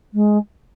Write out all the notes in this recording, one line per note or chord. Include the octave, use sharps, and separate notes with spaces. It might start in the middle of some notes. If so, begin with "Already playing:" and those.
G#3